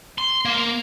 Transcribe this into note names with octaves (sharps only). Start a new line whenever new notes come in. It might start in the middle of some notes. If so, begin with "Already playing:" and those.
C6
A#3